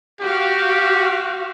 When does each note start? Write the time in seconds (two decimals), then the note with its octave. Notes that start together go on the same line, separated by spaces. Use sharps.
0.21 F#4 G4 F5